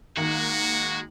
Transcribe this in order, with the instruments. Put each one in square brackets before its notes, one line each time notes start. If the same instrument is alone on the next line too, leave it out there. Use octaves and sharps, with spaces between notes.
[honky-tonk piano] D#3 A#3 [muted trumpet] G#3 [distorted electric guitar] F#4